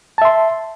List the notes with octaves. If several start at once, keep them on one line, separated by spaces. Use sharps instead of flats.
E5 A5 C6